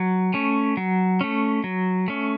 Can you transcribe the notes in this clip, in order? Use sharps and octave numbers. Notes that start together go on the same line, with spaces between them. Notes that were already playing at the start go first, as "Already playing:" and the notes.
Already playing: F#3
A3 C#4
F#3
A3 C#4
F#3
A3 C#4